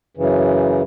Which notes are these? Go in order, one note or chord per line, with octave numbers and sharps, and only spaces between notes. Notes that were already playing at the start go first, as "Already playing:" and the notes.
F#2 C#3 E3